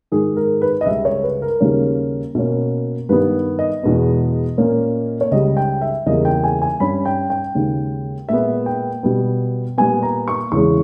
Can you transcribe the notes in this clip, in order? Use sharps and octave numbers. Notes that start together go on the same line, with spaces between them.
G#2 D#3 G#3 G#4
A#4
B4
D#5
C#2 C#3 G3 E5
C#5
B4
A#4
D#2 C#3 G3 A#3 C#4
B2 A#3 C#4
G2 D#3 G3 B3 B4
D#5
E2 B2 G#3 B3
A#2 A#3 C#4
C#5
C#2 C#3 G3 D#5
G5
E5
E2 C#3 G3 A#3 D#5
G5
G#5
G#5
G2 G3 C#4 B5
G5
G5
D#2 C#3 G#3
A#2 G#3 B3 E5
G5
B2 G3 B3
A#2 G3 B3 G#5
A#5
C#6
E2 C#3 E3 G#3 C#4 C#6